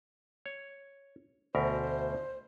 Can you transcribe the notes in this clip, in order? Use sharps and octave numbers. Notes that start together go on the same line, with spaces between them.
C#5
D2 B2 A#4 C5